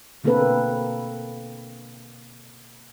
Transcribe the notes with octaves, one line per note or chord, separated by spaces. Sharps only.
B2 D3 A#3 C4 A4 B4